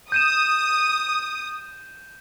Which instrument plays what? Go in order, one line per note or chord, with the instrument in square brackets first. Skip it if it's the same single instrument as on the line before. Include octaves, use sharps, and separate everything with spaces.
[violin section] D#6 [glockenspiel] G6 D#7 E7